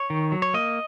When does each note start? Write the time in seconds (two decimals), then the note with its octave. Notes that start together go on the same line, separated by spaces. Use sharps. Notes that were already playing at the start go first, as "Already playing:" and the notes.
Already playing: C#5
0.10 D#3
0.32 F#3
0.42 C#5
0.54 A#3 D#5